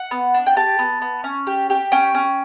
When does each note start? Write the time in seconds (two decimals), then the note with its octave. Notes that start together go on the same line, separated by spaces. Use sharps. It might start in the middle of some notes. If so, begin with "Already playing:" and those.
Already playing: F#5
0.11 B3
0.34 D4
0.46 G5
0.56 G4 A5
0.79 B3
1.02 B3
1.24 C#4
1.47 G4
1.70 G4
1.92 C#4 G5
2.15 C#4